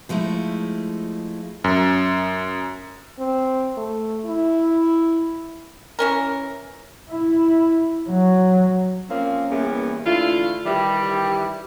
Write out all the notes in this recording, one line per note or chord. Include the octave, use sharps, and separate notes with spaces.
F3 G#3 A3 D#4 E4
F#2
C4
A3
E4
E3 C#4 A#4
E4
F#3
F3 A#3 C4 C#4
E2 E3 G3 A#3 C#4
D3 E3 A3 E4 F4
D#3 E3 G3 G4